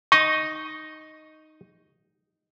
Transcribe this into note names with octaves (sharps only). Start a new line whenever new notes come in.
D#4 D#5 C#6